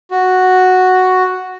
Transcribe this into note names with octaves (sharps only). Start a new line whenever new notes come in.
F#4